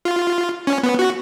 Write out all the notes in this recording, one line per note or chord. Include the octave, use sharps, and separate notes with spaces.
F4
C#4
B3
F#4